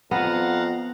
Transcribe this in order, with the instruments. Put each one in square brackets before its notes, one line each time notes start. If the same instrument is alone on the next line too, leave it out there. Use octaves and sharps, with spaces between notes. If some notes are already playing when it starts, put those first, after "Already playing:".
[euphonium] F2 [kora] B3 [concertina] F5 F#5 A#5